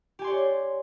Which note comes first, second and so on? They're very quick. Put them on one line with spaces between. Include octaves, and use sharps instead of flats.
G4 G#5 C6 D5 C#5